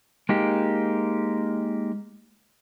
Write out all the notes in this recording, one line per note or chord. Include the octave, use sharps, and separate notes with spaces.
G#3 A#3 D#4 G4